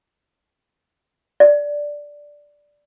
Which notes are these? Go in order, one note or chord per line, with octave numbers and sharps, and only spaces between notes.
D5